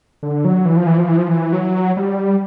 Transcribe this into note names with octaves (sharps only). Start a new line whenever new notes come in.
D3
F#3
E3
F3
E3
F3
E3
F3
E3
F#3
G3